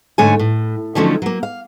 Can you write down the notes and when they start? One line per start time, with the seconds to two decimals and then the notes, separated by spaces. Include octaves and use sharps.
0.18 G#2 D3 A3 C#5 G#5
0.39 A2
0.95 D3 D#3 F3 F#3 A3 C#4
1.22 F#3 A#3
1.43 F5